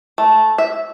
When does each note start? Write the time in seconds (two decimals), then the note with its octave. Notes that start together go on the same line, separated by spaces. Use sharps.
0.18 A3
0.58 E5